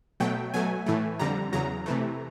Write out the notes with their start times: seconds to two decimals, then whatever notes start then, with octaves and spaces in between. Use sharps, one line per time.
0.20 B2 F#3 A3 G5
0.54 B2 F#3 A3 G#5
0.86 A2 E3 A3
1.19 F2 D3 G3 A#5
1.53 E2 C#3 F#3 A#5
1.86 C3 E3 A3